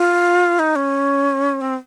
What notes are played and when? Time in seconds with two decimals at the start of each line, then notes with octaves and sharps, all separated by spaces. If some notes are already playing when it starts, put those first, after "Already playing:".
Already playing: F4
0.59 D#4
0.76 C#4
1.61 C4